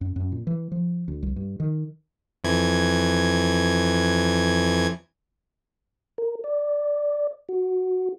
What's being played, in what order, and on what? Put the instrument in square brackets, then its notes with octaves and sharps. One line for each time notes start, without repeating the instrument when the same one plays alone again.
[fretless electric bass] F#2
F#2
A#2
E3
F3
D2
C2
G2
D#3
[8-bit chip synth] F2 E3 G#6
[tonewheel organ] A#4
D5
F#4